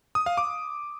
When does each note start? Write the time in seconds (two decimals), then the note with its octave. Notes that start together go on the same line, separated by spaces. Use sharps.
0.15 D#6
0.26 F5
0.38 D6